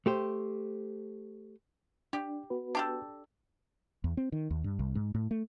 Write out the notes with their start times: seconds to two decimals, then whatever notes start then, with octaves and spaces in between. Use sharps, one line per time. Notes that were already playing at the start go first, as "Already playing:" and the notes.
0.06 A3 G4 C5
2.13 D4 G4
2.50 B3 F#4 B4
2.75 D4 G4 A4
4.04 E2
4.17 C4
4.32 D#3
4.51 D#2
4.64 G2
4.79 C2
4.95 G#2
5.15 A2
5.31 A3